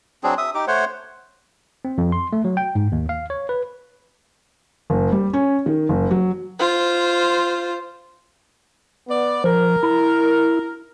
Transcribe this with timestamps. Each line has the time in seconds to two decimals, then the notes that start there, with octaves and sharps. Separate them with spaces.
0.24 F#3 C4 D4 G#4
0.38 E5 D#6
0.54 D#4 G4 D6
0.68 A3 C5 C#5 F#5
1.85 C4
1.98 F2
2.12 C6
2.33 A3
2.45 F#3
2.57 G5
2.75 G#2
2.92 D#2
3.09 F5
3.30 C#5
3.49 B4
4.90 F#1
5.12 G3
5.33 C#4
5.66 D#3
5.89 F#1
6.11 F#3
6.60 F4 C5
9.07 B3 D5
9.44 F3 A#4
9.83 E4